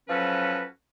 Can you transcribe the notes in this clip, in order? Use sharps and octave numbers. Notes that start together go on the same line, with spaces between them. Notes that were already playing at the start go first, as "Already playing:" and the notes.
F3 F#3 C#4 F#4 A4 B4